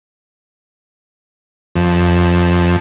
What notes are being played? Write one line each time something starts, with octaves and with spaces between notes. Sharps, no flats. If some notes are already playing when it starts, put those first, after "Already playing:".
F2